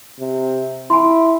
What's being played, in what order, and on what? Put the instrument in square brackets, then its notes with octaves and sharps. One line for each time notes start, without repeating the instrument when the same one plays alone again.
[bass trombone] C3
[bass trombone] E4 [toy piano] G#5 B5 C6